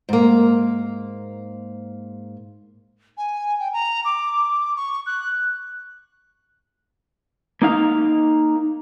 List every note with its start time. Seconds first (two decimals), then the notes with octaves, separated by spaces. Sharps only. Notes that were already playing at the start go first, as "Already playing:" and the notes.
0.09 G#2 A#3
3.17 G#5
3.59 G5
3.73 A#5
4.05 D6
4.76 C#6
5.06 F#6
7.62 A#3 D#4 F5